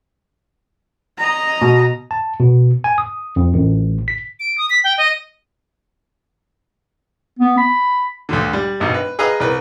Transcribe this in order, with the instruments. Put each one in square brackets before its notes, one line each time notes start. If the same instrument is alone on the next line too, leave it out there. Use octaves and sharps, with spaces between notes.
[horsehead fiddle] D#5 A#5
[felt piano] B2
[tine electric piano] A5
B2
G#5
D#6
F2
A1
B6
[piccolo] D7
D#6
B6
G5
D#5
[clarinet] B3
B5
[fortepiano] D2 G2 D3
G3
G#1 G2 B2
B4
G#4 B4 D#5 F5 A#5 D#6
C2 A#4 B4